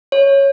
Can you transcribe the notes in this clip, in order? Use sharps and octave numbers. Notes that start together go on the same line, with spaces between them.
C#5